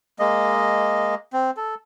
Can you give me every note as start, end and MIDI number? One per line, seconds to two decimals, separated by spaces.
0.19 1.15 56
0.19 1.15 58
0.19 1.15 75
1.33 1.51 60
1.57 1.75 69